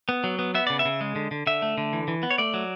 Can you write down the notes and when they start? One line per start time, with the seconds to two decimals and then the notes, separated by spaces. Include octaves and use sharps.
0.09 B3
0.24 F#3
0.39 B3
0.55 B3 E5
0.67 C#3 D5
0.79 E5
0.85 C#3
1.01 G#3
1.16 D3
1.31 D3
1.47 D3 E5
1.62 A3
1.78 D3
1.93 E3
2.08 E3
2.23 B3
2.30 C#5
2.38 A3 D5
2.54 F#3